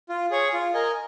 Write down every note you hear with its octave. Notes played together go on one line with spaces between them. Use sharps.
F4
G#4 C#5
F4
A#4 D#5 G#5